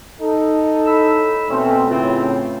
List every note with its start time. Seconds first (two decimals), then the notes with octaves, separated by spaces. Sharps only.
0.20 D#4 A4
0.86 A2 B5 E6
1.49 B2 A3 C4 C#4
1.89 A2 C#3 E3 C4 F4